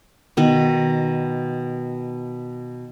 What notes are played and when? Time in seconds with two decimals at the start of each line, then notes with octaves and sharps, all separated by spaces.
0.37 B2 D#3